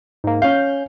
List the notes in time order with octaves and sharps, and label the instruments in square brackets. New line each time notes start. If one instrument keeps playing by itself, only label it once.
[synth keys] G#2 A#3
[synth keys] C#4 G6 [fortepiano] F5